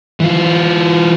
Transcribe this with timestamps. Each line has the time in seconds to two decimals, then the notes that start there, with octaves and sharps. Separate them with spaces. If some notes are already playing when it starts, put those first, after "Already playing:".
0.20 E3 F4